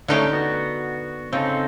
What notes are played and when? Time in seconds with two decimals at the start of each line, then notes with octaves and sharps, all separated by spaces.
0.08 D3 A3 C#4 D#4 E4 G4
0.33 B3 F#4
1.33 C#3 C4 D#4 A4